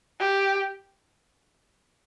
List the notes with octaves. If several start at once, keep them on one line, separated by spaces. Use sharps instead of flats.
G4